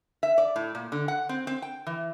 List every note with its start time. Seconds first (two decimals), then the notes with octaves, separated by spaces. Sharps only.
0.23 E5
0.38 D5
0.56 A2
0.75 A#2
0.92 D3
1.08 F#5
1.29 C4
1.47 C4
1.62 G5
1.87 E3